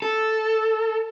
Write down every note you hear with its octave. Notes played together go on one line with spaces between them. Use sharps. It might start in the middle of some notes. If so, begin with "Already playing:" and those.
A4